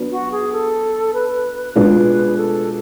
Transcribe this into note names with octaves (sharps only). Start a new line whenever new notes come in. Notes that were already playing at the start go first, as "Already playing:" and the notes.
Already playing: F#3 B3 D4
F#4
G#4
A4
B4
B2 G#3 D4 F4 B4
A4